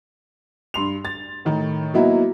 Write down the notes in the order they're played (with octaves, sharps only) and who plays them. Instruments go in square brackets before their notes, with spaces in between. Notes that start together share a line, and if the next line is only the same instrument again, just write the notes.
[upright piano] G2 C6 F7
A6
A2 D#3
F#3 A#3 B3 D#4 E4 F#4